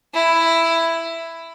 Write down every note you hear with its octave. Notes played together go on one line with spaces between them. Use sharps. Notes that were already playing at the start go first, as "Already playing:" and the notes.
E4